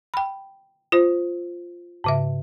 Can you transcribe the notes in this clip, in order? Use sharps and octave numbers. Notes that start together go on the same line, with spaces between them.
G5 B5
F4 C5
G#2 C#3 E5